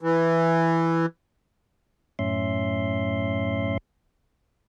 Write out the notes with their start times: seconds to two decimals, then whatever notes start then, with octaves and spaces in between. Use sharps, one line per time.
0.02 E3
2.19 F#2 A2 C#4 E5 C6